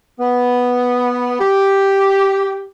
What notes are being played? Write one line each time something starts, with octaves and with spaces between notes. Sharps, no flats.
B3
G4